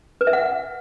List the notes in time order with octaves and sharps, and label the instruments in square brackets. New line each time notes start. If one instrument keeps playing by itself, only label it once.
[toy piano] B4
E5
F#5